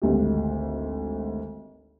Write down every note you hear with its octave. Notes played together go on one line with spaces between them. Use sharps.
G#1 D2 G4